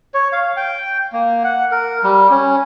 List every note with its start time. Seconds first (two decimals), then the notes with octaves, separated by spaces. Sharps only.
0.14 C#5
0.33 F5
0.57 G5
1.13 A#3
1.44 F#5
1.71 A#4
2.03 G3
2.30 C#4